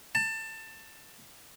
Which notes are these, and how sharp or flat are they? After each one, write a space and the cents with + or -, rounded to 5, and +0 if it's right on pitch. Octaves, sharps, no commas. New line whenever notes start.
A5 +20